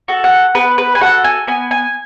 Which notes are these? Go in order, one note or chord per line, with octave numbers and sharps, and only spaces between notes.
F#4 A4
F#5
B3 B4
B4
G#5
F#4 A4 F#5
G#5
B3 G#5
G#5